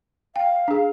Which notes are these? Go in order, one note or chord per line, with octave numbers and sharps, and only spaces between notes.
F5 G5
D4 G#4